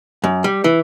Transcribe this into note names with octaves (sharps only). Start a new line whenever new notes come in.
F#2
G3
E3